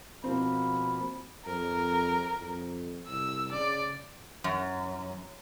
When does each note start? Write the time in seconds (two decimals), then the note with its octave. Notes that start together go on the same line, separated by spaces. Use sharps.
0.24 B2 F3 A#3 C4 B5
1.46 F2 A#4
2.41 F2
3.08 C2 E6
3.53 C#3 D5
4.44 F#2